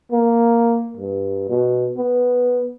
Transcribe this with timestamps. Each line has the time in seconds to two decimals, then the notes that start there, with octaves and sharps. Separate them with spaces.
0.12 A#3
0.97 G2
1.50 B2
1.97 B3